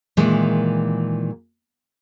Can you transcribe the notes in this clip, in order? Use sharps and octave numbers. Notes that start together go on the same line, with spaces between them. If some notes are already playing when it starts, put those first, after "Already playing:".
A#2 D#3 E3 G#3